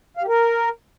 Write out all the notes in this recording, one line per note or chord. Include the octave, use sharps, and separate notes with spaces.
F5
G4
A#4